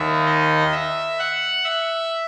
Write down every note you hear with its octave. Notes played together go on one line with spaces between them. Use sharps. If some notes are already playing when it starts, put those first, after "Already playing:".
Already playing: D#2 D#3 E5
D#5
E5
F#5
E5